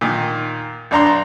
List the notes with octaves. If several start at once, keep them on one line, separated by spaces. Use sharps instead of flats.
A#2 D#3
B1 D4 A#5 C6